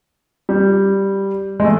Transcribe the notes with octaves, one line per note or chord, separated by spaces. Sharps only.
G3
G#3
A3